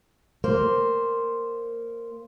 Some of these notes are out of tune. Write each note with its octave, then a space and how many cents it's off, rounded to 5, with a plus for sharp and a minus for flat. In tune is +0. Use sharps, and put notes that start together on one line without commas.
A#3 -10 C5 +0